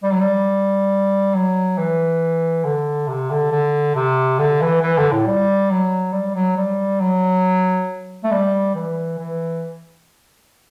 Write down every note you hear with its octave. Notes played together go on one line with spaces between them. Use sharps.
G3
F#3
G3
F#3
E3
D3
C3
D3
D3
C3
D3
E3
E3
D3
A2
G3
F#3
G3
F#3
G3
F#3
A3
G3
E3
E3